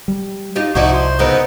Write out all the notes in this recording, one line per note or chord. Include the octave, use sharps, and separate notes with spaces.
G3
D#4 F4 G4
C2 F3 D#4 E4 F#4 D5
C5
C#3 B3 C4 D#4 A#4